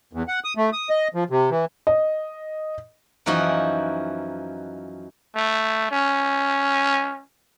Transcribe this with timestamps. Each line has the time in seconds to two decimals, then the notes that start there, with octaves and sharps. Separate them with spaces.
0.13 E2
0.28 F#5
0.44 D#6
0.57 A3
0.73 D#6
0.89 D#5
1.14 F3
1.30 C3
1.51 E3
1.87 D#5
3.26 F#2 E3 F3 D#4 F#4
5.36 A3
5.92 C#4